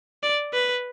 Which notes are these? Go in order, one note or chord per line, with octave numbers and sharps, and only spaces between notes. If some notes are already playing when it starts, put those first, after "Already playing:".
D5
B4